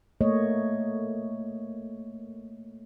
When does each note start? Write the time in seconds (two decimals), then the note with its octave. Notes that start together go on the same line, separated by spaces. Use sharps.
0.21 A3 A#3 C#5 D#5